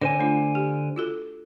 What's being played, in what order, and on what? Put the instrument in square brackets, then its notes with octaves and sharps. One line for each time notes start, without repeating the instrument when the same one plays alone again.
[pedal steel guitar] D3 C5 G#5 [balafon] C#5
[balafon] A3 D4 F4
G4
F4 F#4 A4